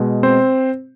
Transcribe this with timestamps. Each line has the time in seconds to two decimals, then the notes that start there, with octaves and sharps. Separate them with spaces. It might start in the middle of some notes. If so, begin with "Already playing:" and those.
Already playing: B2 G#3
0.23 C4 C5